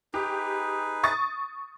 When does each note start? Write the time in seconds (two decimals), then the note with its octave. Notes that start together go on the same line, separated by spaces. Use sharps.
0.14 D#4 G4 G#4 B4
1.03 C#6 D#6 A6